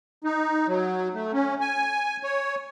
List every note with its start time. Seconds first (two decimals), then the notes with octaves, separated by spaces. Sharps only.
0.24 D#4
0.68 F#3
1.14 A3
1.33 C#4
1.61 G#5
2.23 C#5